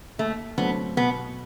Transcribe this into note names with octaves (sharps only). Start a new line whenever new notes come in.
D#2 A3
D3 F#3 A3 B3 C4
B2 B3